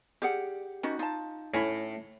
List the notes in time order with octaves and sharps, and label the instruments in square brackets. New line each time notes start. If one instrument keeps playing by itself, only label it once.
[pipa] G3 [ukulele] G4 G#4 F#5
[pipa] D#3 G3 [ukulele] C#4 D#4 F#4
[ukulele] D#4 [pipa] F4 A5
[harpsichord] A2 [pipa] C#4 E4